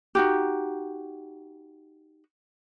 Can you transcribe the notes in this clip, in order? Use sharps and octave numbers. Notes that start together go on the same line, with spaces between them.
D#4 F#4 G4